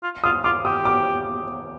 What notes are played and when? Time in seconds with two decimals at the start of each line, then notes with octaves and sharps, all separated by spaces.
0.03 F4
0.24 F4 D#6
0.44 F4 D6
0.65 G4 D#6
0.85 D6